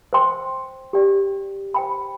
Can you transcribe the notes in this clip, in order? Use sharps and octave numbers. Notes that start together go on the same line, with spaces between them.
C5 G5 C6
G4 D5 G5
C5 G5 B5